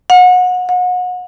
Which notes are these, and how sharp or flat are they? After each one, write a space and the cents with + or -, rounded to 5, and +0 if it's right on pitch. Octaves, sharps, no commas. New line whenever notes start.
F#5 -30
F#5 -35